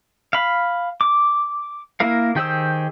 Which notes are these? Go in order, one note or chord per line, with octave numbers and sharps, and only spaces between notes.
F5 B5
D6
A#3 E4 A#4 F5
D#3 G4 G#4 C5 E6